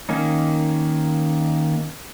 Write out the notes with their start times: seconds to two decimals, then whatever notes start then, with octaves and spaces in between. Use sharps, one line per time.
0.09 D#3 A#3 C#4 D#4